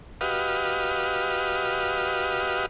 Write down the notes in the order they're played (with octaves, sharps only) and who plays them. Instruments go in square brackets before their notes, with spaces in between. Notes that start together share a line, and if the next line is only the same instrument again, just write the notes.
[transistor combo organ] F#4 G4 B4 D#5 F5